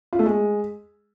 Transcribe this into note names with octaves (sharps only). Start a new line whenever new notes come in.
F4
A3
G#3